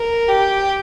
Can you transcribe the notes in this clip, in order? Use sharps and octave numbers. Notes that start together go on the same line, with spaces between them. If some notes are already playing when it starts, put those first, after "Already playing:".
Already playing: A#4
G4